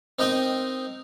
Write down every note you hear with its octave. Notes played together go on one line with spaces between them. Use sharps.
C4 D#4 A#4 D#5 G5